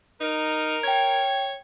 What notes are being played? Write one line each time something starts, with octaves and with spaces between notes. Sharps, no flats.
D#4 A#4
C#5 G5 G#6